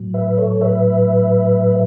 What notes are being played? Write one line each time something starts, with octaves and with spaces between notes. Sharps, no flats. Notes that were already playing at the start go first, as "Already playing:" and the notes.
Already playing: A2 F#3
B4 E5
A4 C#5
B4 E5